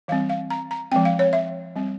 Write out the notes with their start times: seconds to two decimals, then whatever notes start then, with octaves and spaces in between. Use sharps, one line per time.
0.08 E3 G3 C4 F5
0.30 F5
0.50 A#5
0.71 A#5
0.92 F3 G#3 C4 G5
1.05 F5
1.19 C#5
1.33 E5
1.76 G3 C4